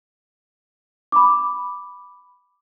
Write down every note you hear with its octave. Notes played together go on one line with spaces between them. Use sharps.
B5 D6